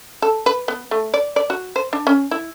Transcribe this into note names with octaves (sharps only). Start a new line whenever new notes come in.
A4
B4
B3
A3
D5
D5
F#4
C5
D4
C#4
E4